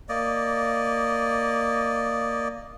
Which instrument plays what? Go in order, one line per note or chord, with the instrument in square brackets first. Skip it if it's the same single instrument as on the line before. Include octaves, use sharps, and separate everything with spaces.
[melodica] A#3 D5 D#5